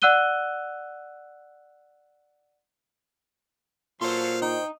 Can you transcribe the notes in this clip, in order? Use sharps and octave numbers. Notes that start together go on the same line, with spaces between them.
D5 F#5 E6 F#6 D#7 G7
A#2 F#3 A4 C5 F5 C6
D#4 G5